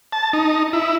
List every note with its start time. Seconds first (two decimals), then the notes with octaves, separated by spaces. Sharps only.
0.13 A5
0.33 D#4
0.73 E4